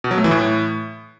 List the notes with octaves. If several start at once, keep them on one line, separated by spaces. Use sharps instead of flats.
B2
F#3
A3
E3
A2